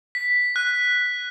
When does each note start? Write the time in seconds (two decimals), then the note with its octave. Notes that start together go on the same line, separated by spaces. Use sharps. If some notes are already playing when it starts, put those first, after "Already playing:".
0.15 B6
0.56 F#6